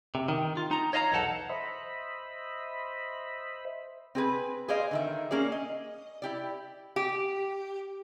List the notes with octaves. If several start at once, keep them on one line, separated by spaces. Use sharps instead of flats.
C3
D#3
F4
D#4 A#5
C#5 D#5 F5 A5 A#5
B1 E2 D#4 A4 F#5 A5
C5 D#5 E5 B5
C4 G#4 B4
G#4 C5 D5 D#5 F5
D3 D#3 E5
A#3 C#4 G#4 D5
D#5
E4 G4 D5
G4